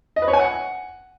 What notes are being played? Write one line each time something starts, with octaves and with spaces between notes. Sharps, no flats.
D#5
B4
C#5
G#5
F#5